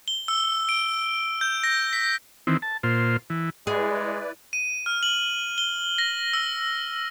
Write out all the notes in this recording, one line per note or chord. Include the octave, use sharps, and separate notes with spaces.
G7
E6
D7
G6
A#6
B6
D#3 E3 C4
A5
A#2 F4 C5
E3
G#3 E4 G#4 B4 D5
D#7
F6
F#7
G7
A#6
E6